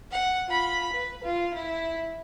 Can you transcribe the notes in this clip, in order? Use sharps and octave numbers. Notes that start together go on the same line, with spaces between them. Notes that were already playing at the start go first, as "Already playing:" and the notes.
F#5
F4 B5
B4
F4
E4